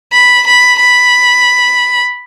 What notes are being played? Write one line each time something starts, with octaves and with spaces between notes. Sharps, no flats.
B5
B5
B5